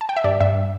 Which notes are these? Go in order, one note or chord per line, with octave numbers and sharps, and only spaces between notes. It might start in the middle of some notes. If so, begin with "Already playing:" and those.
A5
G5
E5
G2 D5
G2 E5